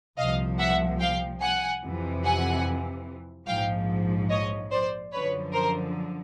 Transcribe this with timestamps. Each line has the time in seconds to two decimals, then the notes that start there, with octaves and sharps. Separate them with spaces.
0.17 C2 A#2 F3 D#5 F5
0.59 E5 F#5
1.00 F5 G5
1.41 F#5 G#5
1.82 F2 C3 E3
2.24 F#5 G#5
3.47 A#1 G#2 F3 F5 G5
4.30 C#5 D#5
4.71 C5 D5
5.12 F#2 D3 F3 B4 C#5
5.53 A#4 C5